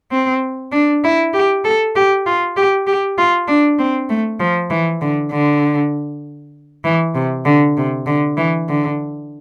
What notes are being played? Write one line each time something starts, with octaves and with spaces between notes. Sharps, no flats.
C4
D4
E4
G4
A4
G4
F4
G4
G4
F4
D4
C4
A3
F3
E3
D3
D3
E3
C3
D3
C3
D3
E3
D3